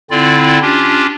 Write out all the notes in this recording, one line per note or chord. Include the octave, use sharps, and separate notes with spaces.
D3 C4 E4 F4 D5
C#4 D4 F4 G4